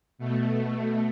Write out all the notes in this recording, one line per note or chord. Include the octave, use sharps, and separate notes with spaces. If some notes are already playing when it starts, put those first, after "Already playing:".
B2 A3